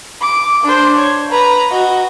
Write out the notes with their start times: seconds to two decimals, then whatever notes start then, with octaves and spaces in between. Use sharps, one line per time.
0.21 D6
0.63 D4 C5
0.97 C#5
1.31 B4 A#5
1.71 F#4 D#5